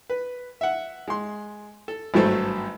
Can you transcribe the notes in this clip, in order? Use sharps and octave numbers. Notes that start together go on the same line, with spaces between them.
B4
E5 F#5
G#3 C6
A4
G#1 G2 F#3 A3 A4 C5